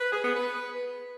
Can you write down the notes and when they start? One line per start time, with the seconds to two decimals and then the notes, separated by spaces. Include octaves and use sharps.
0.01 B4
0.12 G#4
0.24 B3
0.36 B4